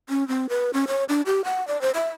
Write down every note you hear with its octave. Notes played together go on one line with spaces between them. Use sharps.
C#4
C4
B4
C#4
C#5
D4
G4
F#5
D5
C5
E5